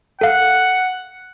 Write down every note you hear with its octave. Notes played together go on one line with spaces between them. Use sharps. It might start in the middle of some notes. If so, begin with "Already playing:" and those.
A4 F5 F#5